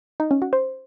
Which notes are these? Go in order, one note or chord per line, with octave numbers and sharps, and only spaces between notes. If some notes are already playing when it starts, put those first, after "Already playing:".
D#4
C#4
F#4
C5